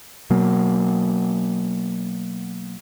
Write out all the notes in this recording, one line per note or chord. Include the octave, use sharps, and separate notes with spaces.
B2 F#3 A#3